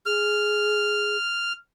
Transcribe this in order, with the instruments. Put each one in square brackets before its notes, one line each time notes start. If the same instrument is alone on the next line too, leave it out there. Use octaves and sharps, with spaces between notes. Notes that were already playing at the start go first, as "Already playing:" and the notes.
[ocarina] G#4 [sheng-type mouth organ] F6